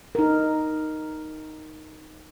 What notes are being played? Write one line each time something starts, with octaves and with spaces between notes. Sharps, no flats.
D#4 A#4